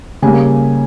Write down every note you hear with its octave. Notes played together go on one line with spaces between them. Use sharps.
C#3 G3 A#3 G#5